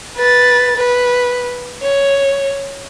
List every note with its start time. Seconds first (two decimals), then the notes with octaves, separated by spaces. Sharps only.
0.17 B4 A6
0.76 B4
1.81 C#5